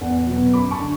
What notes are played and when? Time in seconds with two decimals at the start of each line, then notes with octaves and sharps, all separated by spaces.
0.01 E2 D5 F#5
0.27 B2 F#3 B3
0.53 F#2 B5 D6
0.71 A5 C#6
0.80 D3